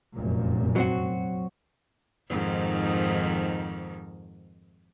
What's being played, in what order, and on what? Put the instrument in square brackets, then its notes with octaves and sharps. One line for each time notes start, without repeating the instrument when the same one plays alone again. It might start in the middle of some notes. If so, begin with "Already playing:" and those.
[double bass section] F1 F#2 A#2
[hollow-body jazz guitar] F#3 C4 F#4
[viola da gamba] F2 G#2 D#3